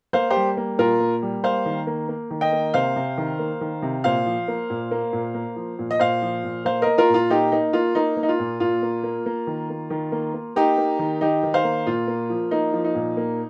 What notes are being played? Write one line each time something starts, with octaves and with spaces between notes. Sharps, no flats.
A#3 C5 F5
G4 C5
G3
A#3
A#2 F4 A#4
A#3
G3
A#3 C5 F5
D#3
A#3
A#3
D#3
D#5 G5
A#3
C3 C5 F5
C3
D#3
A#3
D#3
C3
A#2 C5 F5
F3
A#3
A#2
A#3
A#2
A#3
F3
A#2
D#5
A#2 C5 F5
F3
A#2
A#3 C5 F5
A#3 A#4 D#5
F4 A#4
A#2
F4
A#3 D#4 G4
A#3 D#4
A#3 F4
A#3 D#4
A#3
D#4
F4
A#2
A#2 F4
A#3
A#3
A#3
D#3
A#3
D#3
A#3
A#3
A#3 D#4 G4
A#3
D#3
D#3 D#4 G4
D#3
C5 F5
A#3
A#2 F4
A#3
F3
A#3 D#4
F3
D#4
A#2
A#3